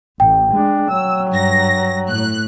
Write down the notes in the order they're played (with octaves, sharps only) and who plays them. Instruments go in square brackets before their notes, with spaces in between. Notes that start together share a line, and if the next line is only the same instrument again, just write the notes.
[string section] A1 [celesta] G5
[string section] G#3 [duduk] D4
[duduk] F#3 [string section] E6
[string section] G2 A#6
A2 F#6